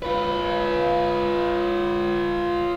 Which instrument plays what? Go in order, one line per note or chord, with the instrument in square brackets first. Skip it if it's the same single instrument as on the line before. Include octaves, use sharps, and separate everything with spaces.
[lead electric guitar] F4 B4